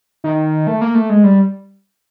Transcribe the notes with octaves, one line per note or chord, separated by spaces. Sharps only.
D#3
A3
A#3
A3
G#3
G3